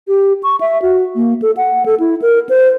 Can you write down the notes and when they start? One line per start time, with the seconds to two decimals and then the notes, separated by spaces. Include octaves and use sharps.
0.08 G4
0.43 C#6
0.61 E5
0.82 F#4
1.15 A#3
1.42 A4
1.57 F#5
1.86 A4
2.00 E4
2.22 A#4
2.49 C5